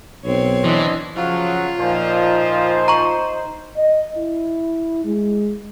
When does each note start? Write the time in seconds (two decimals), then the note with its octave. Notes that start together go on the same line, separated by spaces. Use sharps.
0.25 B1 C4 C#5
0.64 E3 D4 D#5 C6
1.16 C#3 F3 F#3 F4
1.79 A#2 F3 D#4 C5
2.88 A#5 C#6
3.76 D#5
4.16 E4
5.04 G#3